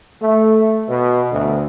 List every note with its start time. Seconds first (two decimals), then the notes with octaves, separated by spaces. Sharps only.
0.21 A3
0.89 B2
1.31 D2